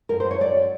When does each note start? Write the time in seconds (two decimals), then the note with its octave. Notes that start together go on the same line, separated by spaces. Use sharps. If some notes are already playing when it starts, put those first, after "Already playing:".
0.09 F#2 A#4
0.20 C5
0.25 F#2
0.31 C#5
0.40 F#3 D5
0.56 F#3